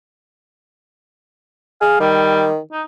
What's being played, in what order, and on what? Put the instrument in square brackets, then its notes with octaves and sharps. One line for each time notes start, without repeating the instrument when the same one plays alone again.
[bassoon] G#4 [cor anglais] F5
[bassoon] D#3 [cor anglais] G3
[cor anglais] D#4